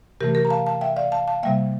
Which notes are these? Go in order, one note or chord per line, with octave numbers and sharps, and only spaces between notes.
C3 E3 A3 G4 A#4
G4 A#4
A#5
F5 A5
F5 A5
E5 G5
D5 F5
F5 A5
F5 A5
C3 G3 A#3 E5 G5